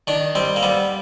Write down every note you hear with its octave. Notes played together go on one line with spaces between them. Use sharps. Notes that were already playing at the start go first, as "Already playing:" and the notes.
D#3 D4
G3 C4
A#3
G3 B3